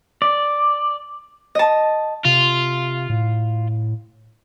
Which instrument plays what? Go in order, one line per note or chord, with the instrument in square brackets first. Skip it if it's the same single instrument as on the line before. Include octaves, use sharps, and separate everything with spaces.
[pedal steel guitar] D5
[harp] D#5 A5
[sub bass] C3 [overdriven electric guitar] F4
[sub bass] A2